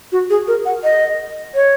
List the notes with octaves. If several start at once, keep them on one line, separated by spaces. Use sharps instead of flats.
F#4
G#4
A#4
F#5
D#5
C#5